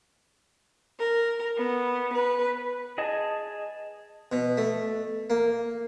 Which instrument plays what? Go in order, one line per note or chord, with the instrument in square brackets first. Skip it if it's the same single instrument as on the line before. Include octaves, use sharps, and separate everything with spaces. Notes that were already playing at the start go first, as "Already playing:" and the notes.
[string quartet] A#4
B3
B4
[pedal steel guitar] G#4 D#5 G#5 A5
[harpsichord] B2
A3
A#3